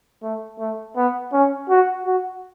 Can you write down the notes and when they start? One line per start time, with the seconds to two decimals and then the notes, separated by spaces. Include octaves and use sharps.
0.23 A3
0.59 A3
0.96 B3
1.33 C#4
1.69 F#4
2.06 F#4